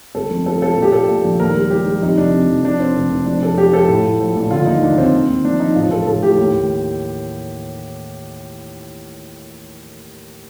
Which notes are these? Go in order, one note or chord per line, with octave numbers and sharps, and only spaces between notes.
G1 A4
F2
F3 A4
F3 A4
A#1 G4
A#2 A4
A#2
A#1
D#2 A#4
G3
G3 G4
G3
F2 D#4
F1 D4
C3
F1
F3 D4
F3 C4
F1
F1
F2 D4
F2 A4
F3 G4
F3 A4
A2
A2
F3
A#1
D3 F4
D#2 D#4
D#2 D4
D#2 C4
D#2
D#2
F3 D4
F3 D#4
A1 F4
A1 A4
A1 A4
A2 G4
D#2
D#2